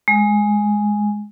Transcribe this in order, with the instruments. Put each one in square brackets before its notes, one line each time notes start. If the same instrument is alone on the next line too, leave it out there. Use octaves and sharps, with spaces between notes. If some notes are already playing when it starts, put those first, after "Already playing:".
[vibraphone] G#3